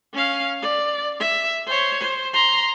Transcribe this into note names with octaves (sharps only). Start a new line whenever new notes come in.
C#4 F5
D5
E5
C5 C#5
C5
A#5 C6